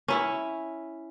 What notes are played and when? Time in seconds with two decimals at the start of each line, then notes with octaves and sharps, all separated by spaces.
0.08 C#4 E4